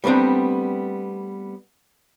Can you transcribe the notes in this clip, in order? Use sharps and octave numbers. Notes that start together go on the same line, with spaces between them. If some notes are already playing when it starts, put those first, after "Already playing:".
G3 A3 B3 C4 D4